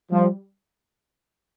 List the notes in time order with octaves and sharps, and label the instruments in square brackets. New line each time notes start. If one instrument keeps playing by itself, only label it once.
[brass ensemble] F3 [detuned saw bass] G3